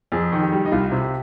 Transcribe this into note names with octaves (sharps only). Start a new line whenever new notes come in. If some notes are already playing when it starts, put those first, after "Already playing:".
F2 G#4
D#3
G4
G3
D#4
C2 F4
C3
G4